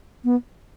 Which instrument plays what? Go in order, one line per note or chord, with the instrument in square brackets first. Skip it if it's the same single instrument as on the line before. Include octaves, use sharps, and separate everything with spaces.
[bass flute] B3